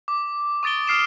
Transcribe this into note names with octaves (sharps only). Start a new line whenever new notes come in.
D6
C#6 D#6 A6 D7 G7
D#6 F6 C7 D7 E7